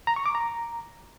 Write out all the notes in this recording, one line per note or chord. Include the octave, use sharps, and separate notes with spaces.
A#5
C#6
D6
A#5